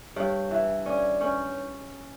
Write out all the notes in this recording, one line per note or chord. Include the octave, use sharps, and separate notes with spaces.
G2 C#5
E3
C#4 D5
C#4 C#5